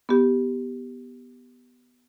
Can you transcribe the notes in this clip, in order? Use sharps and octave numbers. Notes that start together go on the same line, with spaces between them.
B3 G4